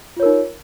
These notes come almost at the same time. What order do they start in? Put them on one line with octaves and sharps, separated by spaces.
F4 C#5 A#4 D#4